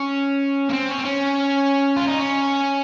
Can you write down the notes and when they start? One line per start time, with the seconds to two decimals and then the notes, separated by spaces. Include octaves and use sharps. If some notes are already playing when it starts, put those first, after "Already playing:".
Already playing: C#4
0.69 A#3
0.73 C4
0.89 C#4
0.99 C4
1.05 C#4
1.96 F4
2.07 D#4
2.19 C#4